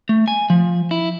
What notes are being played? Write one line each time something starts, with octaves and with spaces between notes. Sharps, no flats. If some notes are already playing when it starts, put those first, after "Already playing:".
A3
G#5
F3
E4